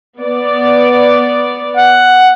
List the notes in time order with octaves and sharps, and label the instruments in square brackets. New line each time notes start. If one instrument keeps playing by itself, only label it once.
[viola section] B3 D5
[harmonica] F#5